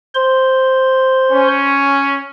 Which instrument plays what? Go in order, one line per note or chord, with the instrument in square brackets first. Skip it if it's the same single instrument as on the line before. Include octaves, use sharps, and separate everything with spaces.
[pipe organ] C5 C6
[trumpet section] C#4